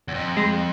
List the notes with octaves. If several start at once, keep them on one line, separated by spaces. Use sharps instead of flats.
E2
F2
G#3